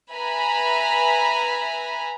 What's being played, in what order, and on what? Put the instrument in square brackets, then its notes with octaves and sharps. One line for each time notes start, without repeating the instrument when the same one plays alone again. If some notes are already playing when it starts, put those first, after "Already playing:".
[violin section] B4 E5 G#5 A#5 B5